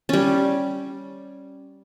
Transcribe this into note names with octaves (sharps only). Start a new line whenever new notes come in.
G3 C#4